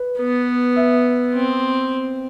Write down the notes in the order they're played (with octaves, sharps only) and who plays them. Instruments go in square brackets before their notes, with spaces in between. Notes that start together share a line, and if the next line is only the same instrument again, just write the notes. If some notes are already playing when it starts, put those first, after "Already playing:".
Already playing: [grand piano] B4
[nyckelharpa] B3
[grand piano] E5
[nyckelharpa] C4